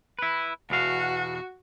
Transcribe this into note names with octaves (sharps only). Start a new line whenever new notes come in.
E4 B4
E2 B2 F#4 F5